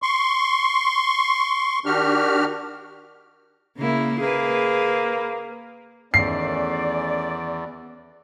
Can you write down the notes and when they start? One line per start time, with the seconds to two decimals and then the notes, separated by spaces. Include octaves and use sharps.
0.02 C6 C#6
1.85 D#3 D4 F#4 G4 F6
3.77 C#3 A#3 E4
4.21 A#3 G#4 B4
6.14 E2 D#3 A3 C#4 D5 C7